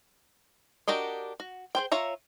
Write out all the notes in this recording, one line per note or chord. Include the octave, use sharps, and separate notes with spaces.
D4 F#4 G4 A#4 D#5
F#4
G#4 C5 G5
F4 C#5 E5 A#5